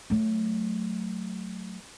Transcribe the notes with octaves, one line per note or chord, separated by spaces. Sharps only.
F#3 A3